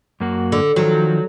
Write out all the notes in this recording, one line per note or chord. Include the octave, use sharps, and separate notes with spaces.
F#2 A#3 F#4
D3
D#3 F3 F#3